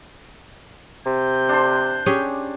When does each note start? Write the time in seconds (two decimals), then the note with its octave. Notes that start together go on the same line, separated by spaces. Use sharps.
1.06 C3 G6
1.49 D4 C5
2.06 C#4 G4 G#4